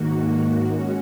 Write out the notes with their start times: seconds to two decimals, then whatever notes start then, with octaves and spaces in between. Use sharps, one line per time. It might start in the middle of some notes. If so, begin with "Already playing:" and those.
Already playing: G#2 D#3 A#3 F#4
0.65 G#3 C#4 F#4